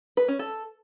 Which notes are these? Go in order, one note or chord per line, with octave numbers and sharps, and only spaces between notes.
B4
C#4
A4